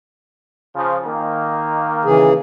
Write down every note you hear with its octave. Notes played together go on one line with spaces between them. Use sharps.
C#3 F3
D#3 A#3
C#3 E3 G#4